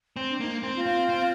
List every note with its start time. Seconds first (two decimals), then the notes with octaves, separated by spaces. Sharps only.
0.17 C4
0.29 D4
0.40 A#3 D#4
0.63 C4
0.75 F4
0.86 C4
1.09 C4